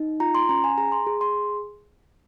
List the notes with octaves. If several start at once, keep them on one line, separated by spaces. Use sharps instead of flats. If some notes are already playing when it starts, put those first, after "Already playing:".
Already playing: D#4
F4 A#5
C6
C#4 A#5
G#5
G#4 A#5
C6
G#4
C6